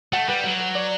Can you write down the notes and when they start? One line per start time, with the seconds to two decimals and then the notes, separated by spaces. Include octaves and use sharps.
0.13 A3 F#5
0.28 G3 B4
0.43 F#3 F#5
0.60 B4
0.75 D5